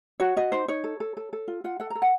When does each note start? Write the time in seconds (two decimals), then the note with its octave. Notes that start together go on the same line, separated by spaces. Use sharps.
0.20 F#4 C#5
0.36 F#4 D#5
0.52 D#4 C5
0.68 D#4 C#5
0.84 A4
1.00 A4
1.17 A4
1.33 A4
1.48 F4
1.64 F4 F#5
1.80 A4 F#5
1.90 A#5
1.95 A4
2.02 F#5